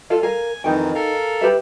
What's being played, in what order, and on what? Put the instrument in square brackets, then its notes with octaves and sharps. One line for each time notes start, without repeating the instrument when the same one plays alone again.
[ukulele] F4 A4 F5
[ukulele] A#4 F5 [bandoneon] G#5
[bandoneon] F2 D#3 E3 [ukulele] D#4 G5
[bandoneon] A4 A#4 F5
[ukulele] G4 B4 E5